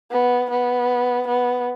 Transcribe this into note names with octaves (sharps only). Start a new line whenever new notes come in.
B3
B3
B3